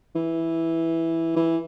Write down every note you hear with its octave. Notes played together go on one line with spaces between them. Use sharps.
E3
E3